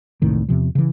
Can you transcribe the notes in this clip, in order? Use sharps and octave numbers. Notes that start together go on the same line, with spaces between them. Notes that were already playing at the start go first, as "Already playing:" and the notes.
E1 C2 A2 D#3
E2 C3 F3
C#3 E3